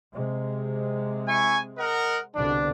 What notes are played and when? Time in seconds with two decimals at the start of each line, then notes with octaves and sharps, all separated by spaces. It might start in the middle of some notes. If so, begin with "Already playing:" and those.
0.13 C3 G#3
1.28 E4 G#5 C#6
1.78 A#4 D#5 F#5
2.35 C2 B2 D3 D4